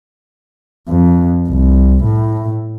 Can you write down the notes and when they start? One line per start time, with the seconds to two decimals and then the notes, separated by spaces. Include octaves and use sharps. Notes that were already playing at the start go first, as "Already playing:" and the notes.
0.89 F2
1.48 C2
2.04 A2